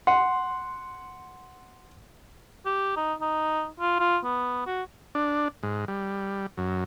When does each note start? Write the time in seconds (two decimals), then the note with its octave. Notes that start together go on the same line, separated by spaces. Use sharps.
0.07 F#5 C6
2.66 G4
2.96 D#4
3.21 D#4
3.80 F4
3.99 F4
4.24 B3
4.67 F#4
5.15 D4
5.63 G#2
5.88 G3
6.58 F#2